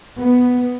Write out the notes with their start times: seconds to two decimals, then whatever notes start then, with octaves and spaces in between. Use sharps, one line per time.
0.18 B3